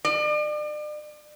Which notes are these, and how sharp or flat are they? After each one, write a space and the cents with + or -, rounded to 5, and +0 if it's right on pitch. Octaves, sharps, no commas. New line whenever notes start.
D5 +40